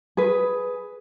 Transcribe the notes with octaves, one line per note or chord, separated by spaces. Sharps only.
G#4 B4